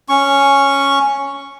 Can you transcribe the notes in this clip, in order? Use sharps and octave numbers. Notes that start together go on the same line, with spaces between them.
C#4 C#6